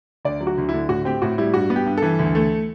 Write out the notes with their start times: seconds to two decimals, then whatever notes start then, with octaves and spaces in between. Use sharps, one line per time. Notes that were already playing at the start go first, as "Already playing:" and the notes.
0.25 D2 D5
0.41 F#3
0.47 F#4
0.58 D2
0.69 E4
0.74 D3
0.89 A2 F#4
1.05 C4 G4
1.22 A2 F#4
1.38 G3 E4
1.54 G2 F#4
1.70 B3
1.76 G4
1.86 G2
1.98 E3 A4
2.19 D2
2.35 A3